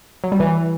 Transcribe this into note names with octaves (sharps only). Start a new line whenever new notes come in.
F#3
G3
E3